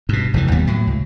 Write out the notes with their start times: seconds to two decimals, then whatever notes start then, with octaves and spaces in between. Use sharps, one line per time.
0.09 G2 B2
0.34 F1 D#2 C3 E3
0.51 D#2 A#2 G3 B3
0.67 A2 F#3
0.87 C#2